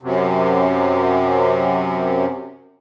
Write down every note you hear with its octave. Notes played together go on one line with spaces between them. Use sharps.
F#2 C3